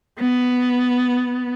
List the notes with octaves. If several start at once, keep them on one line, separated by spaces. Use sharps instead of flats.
B3